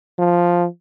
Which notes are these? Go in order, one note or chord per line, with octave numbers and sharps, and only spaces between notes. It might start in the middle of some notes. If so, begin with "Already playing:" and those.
F3